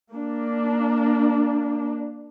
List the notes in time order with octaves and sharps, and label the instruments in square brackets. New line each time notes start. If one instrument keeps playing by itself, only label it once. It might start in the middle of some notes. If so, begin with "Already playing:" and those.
[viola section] A#3 D4